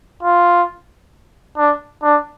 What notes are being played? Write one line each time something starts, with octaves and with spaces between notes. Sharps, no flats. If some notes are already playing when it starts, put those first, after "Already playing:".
F4
D4
D4